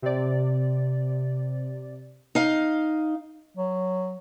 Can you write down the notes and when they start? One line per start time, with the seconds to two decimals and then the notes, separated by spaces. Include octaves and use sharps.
0.02 C3 D5
2.35 D#4 F5
3.57 F#3